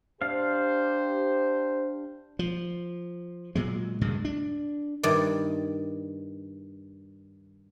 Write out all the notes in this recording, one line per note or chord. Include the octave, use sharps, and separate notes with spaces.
D4 G4 C5 F5
F3
A#2 F#3 G#3
C#2 G2 A#2 G#3
D4
G2 D#3 D5